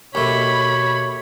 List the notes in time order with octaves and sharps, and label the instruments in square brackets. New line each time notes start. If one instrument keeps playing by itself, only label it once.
[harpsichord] D#2 A3 [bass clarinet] B2 [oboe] C#5 [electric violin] B5